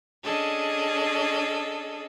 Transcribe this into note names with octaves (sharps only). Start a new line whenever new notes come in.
C#4 D4 G#4 A4 D#5